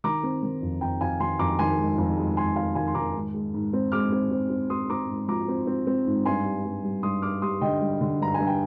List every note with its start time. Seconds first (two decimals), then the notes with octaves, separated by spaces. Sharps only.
0.04 D#3 A#5 D6
0.23 C4
0.43 D#3
0.62 F2
0.81 F2 G5 A#5
1.01 F2 F5 G#5
1.20 D#3 G#5 C6
1.39 F2 A#5 D6
1.59 D#3 G#5 C6
1.78 G#3
1.98 F2
2.17 G#3
2.37 G#3 G#5 C6
2.56 G#3 F5 G#5
2.75 D#3 F5 G#5
2.87 C6
2.95 D#3 A#5 D6
3.15 G#2
3.34 G#3
3.54 G#2
3.73 C4
3.92 G#3 D6 F6
4.12 C4
4.31 C4
4.50 C4
4.70 C4 C6 D#6
4.90 C4 A#5 D6
5.09 G#2
5.28 F3 A#5 D6
5.48 C4
5.67 C4
5.87 C4
6.06 G#2
6.25 G2 G#5 C6
6.45 G3
6.64 G2
6.84 G3
7.03 G2 C6 D#6
7.22 G2 D6 F6
7.42 G3 C6 D#6
7.61 D3 D#5 G5
7.81 G3
8.01 D3
8.20 G2 A#5
8.34 G2 G#5
8.47 G5